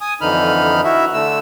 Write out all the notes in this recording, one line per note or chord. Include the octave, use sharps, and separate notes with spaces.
G#5 D#6
F2 D3 E3 D#4 B5 F6
E4 F#4 E5
D3 A3 E6